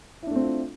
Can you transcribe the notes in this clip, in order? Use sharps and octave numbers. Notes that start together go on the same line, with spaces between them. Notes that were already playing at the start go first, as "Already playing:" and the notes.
A3 C4 D4 E4 F4